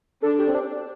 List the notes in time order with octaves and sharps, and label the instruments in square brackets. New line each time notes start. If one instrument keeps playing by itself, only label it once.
[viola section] D4 [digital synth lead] A4
[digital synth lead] G4
C4
D4